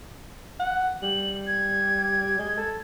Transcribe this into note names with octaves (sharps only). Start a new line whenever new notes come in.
F#5
G3 F#7
G#6
G#3
A4